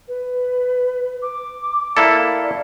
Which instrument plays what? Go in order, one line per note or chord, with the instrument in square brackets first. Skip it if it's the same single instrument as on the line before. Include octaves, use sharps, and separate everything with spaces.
[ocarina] B4
D6
[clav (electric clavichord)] A#3 E4 A4 [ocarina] D5